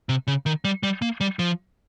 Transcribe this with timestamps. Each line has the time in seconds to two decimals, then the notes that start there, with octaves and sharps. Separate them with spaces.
0.09 C3
0.27 C#3
0.46 D#3
0.65 G3
0.83 G3
1.02 A#3
1.21 G3
1.39 F3